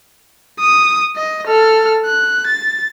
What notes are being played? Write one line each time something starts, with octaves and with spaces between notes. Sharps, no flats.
D#6
D#5
A4 F6
F#6
A6